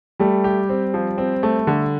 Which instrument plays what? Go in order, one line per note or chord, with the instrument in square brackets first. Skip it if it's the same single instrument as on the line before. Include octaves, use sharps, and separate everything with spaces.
[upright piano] G3 [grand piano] A3
[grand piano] G4
C4
F3
C4
A3
D3